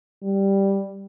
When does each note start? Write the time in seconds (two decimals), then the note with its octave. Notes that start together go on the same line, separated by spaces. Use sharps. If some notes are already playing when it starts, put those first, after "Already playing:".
0.23 G3